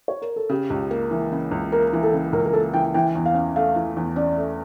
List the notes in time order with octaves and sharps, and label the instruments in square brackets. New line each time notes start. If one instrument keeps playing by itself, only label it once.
[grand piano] C#5
A#4
A4
[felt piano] C#3 [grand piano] G4
[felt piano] C#2
A#3
E3
C#3
C#2
[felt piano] A#3 [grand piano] A#4
[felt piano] E3
[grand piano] A4
[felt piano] C#3
[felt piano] C#2 [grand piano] A#4
[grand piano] A#4
[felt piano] A#3 [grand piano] A4
[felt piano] E3 [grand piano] G5
[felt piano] E3 [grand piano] G5
[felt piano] E2
[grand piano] F5
[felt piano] C#4
[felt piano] A3 [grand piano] F5
[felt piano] E3
E2
[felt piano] C#4 [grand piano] D5
[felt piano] A3